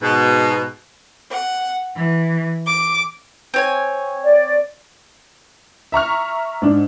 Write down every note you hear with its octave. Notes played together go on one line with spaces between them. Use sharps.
G#2 B2
F#5
E3
D6
C4 C#5 G#5
D5
E5 A#5 C#6 F6
G#2 D4